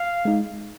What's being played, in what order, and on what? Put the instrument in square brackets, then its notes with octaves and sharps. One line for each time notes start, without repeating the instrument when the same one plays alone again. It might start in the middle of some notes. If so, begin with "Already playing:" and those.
Already playing: [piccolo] F5
[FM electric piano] G#3 D#4